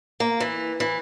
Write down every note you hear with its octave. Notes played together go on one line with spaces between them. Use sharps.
A#3
E3
E3